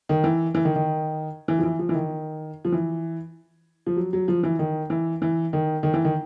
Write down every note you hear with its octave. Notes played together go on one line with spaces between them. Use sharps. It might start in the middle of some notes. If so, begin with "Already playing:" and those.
D#3
E3
E3
D#3
D#3
E3
F3
E3
F3
E3
D#3
F3
E3
F3
F#3
F#3
F3
E3
D#3
E3
E3
D#3
D#3
E3
D#3